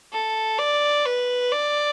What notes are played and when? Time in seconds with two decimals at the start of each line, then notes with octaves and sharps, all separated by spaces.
0.13 A4
0.59 D5
1.06 B4
1.52 D5